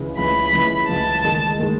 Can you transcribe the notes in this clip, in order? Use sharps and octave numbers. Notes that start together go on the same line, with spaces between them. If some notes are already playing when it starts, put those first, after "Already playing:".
Already playing: C#2 C#3 E3
C#2 C#3 E3 B5
C#2 C#3 E3
C#2 C#3 E3 A5
D#3 G#3 D#4 G#4
D#3 G#3 D#4 G#4